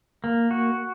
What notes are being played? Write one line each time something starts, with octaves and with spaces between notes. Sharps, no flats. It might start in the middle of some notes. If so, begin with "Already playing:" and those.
A#3
F#4